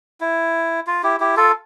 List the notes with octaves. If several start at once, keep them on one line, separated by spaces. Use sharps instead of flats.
E4
F4
E4 G4
E4 G4
F4 A4